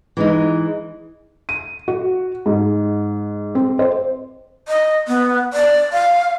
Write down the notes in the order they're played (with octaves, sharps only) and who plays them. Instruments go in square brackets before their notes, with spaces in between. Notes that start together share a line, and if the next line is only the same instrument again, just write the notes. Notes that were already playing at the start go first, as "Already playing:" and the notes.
[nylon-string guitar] E3 G#3 D#4
[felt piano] D#7
F#4
G#2
C4
C5
[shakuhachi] D#5
B3
D5
F5